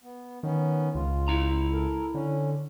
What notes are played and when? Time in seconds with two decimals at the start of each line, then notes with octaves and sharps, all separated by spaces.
0.03 B3
0.43 D#3 B3 C#4
0.95 C#2 F4
1.28 E4 A#5
1.73 A4 A#4
2.14 D3 C#4